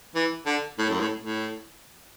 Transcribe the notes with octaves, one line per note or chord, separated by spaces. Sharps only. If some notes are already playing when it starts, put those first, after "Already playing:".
E3
D3
A2
F#2
A2
A2